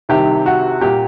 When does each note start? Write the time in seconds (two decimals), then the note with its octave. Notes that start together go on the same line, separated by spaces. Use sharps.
0.09 C2 C3 D#3 G4
0.46 F#4
0.81 A#2 G4